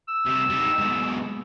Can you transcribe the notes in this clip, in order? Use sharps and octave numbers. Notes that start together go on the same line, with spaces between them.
E6
C3 G3
G3 D#4
G#2 B2